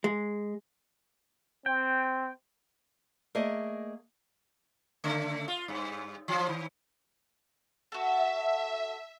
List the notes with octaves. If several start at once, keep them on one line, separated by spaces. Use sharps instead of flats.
G#3
C4 G5
A3 A#3 G#4 D5 D#5
C#3 A3
F4
G2
E3 F3
D#3
F#4 A4 E5